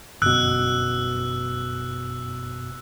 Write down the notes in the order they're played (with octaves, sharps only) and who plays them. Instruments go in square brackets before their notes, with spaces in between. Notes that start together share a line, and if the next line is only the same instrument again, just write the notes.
[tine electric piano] G1 F#2 B2 [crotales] E6 F#6